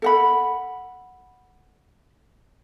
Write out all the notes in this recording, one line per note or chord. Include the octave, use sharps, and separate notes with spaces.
A4 F#5 B5